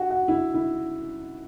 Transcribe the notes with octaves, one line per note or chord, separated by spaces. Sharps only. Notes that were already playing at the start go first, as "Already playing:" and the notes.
Already playing: F#4
F#4
E4
E4